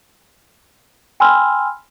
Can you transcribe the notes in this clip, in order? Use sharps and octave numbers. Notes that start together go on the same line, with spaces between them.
G5 G#5 B5 C6 E6 F6